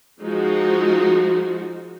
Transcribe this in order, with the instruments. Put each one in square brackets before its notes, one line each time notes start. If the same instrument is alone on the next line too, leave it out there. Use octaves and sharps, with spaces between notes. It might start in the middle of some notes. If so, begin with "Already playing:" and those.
[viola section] F3 G#3 D#4 F#4